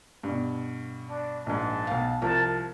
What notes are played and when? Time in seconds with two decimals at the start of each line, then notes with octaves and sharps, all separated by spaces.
0.23 G2 B2
1.09 D4
1.46 A#1 G#2 A5
1.87 B1 F5
2.22 C2 F3 A#4 A5